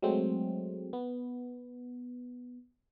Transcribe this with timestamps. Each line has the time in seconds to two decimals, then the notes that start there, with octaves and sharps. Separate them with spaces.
0.02 F#3 G#3 A3 C4
0.93 B3